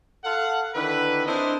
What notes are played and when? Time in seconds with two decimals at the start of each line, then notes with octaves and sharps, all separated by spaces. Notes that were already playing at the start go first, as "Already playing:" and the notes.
0.25 A4 F5 F#5
0.75 D3 D#3 E4 B4
1.26 C4 D4 E4 A#4 C5 D#5